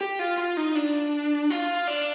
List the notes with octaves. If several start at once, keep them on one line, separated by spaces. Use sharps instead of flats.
G4
F4
F4
D#4
D4
F4
D4